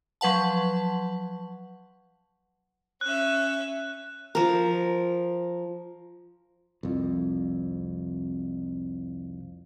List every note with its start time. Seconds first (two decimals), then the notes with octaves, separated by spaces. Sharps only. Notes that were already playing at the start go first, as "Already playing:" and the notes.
0.21 F3 F#3 B4 F#5 A5
3.01 C#4 E5 F#6
4.35 F3 A#4
6.83 C2 F2